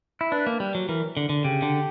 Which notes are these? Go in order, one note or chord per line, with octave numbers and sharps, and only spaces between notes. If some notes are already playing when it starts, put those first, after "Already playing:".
E4
D4 B4
A#3
G3
F#3
E3 A#4
D3
D3
C#3 G4
D3